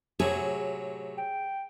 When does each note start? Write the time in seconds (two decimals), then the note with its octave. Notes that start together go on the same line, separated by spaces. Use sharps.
0.20 A2 C3 F#3 G#4
1.18 G5